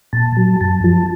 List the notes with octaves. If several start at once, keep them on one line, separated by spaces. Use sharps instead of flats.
A#2 A5
F#3
F#2 A5
F3 A5